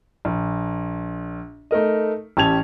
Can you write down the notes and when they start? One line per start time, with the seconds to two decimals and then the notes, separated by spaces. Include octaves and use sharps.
0.25 A#1
1.71 A3 D#4 A#4 D#5
2.37 A1 C#4 G4 A5 G#6 F7